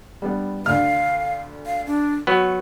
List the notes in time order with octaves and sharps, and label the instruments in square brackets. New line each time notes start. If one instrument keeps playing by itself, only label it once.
[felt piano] G3 B3 D4
[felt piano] D2 D3 F6 [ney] F5
[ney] F5
D4
[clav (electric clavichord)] F#3 B3 [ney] C#6